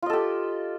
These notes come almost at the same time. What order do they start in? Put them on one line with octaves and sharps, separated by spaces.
F4 D#5 A4 G4